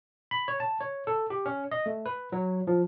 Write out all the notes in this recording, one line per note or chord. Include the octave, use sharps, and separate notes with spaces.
B5
C#5
A5
C#5
A4
G4
C#4
D#5
A3
B4
F#3
F3